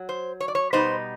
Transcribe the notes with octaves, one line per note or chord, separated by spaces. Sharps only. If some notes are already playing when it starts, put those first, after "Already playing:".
Already playing: F#3
C5
C#5
D5
C#5
B2 G3 B3 D#4 C5